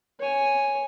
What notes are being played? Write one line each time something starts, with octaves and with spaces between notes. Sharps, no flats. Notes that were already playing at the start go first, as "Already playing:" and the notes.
C#5 G#5